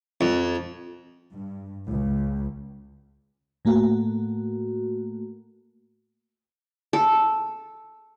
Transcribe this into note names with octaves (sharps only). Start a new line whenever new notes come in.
F2
G2
C#2
A2 A3 A#3 F#4
A4